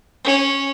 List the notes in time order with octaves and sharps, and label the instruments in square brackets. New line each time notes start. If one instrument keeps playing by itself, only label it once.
[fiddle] C#4